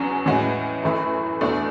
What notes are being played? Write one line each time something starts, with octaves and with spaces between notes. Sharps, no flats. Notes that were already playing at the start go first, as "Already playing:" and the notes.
Already playing: E2 C#3 F#3 C#4
A2 E3 G#3 C#4 F#4
F#2 E3 A3 E4
E2 B2 A3 D4